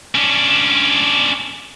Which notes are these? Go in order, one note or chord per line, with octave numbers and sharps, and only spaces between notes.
C#4 D4